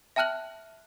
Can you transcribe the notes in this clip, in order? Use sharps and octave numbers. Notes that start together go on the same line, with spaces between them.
E5 G5 A5 F6 F#6 F#7